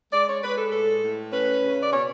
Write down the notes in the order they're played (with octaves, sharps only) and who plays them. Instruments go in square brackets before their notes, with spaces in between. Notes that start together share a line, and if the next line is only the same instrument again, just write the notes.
[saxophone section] G#3 D5
C#5
G#3 B4
A4
A2 A4
A2
C#4 B4
C#3
D5
B2 C#5